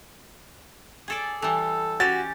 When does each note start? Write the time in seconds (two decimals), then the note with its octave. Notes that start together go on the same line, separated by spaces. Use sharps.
1.08 G#4 A4 D5
1.42 E3 G3 A4
2.00 C#4 F#4 G4 A6